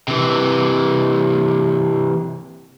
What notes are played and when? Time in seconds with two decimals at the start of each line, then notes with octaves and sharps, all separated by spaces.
0.08 C3 E3